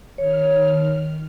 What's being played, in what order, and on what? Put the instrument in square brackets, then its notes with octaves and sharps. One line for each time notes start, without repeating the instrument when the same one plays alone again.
[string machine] D#3 F6 [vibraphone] C#5